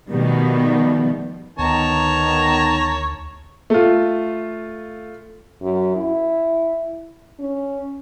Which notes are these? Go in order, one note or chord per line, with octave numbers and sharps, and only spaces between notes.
B2 D#3 F3 G3 A3 B3
D2 D#3 B3 C#5 A5 A#5
A3 F4
F#2
E4
C#4